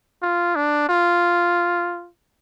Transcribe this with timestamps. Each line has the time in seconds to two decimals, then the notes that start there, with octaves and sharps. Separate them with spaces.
0.22 F4
0.55 D4
0.89 F4